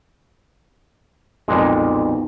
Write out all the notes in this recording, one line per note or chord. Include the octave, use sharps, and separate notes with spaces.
B1 F2 A#2 G#3